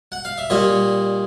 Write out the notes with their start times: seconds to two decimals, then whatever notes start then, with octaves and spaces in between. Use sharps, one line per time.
0.12 F#5
0.25 F5
0.38 E5
0.50 A#2 G3 C#5 D#5